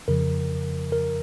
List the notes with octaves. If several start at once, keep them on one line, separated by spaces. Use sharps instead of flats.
F2 C#3 F3 A#4
A#4